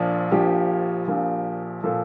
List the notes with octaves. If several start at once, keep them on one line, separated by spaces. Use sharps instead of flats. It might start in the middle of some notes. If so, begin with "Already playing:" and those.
Already playing: A#1 A#2 F3 D4
A#1 A#2 F3 G4
A#1 A#2 F3
A#2 F3 A4